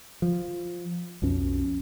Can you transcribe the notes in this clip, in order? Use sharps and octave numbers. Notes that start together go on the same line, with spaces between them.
F3
B1 F2 B2 C#4